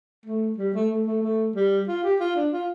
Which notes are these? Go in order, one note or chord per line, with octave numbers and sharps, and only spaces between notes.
A3
G3
A3
A3
A3
A3
G3
F4
G4
F4
D4
F4